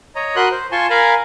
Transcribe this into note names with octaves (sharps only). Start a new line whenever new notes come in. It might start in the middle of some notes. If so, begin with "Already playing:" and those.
C#5 D#5 A#5
F#4 A#4 B5 C6 D#6 F#6
C5
F4 G#5 A5 C6 C#6
A#4 F5 G#5 A#5 B5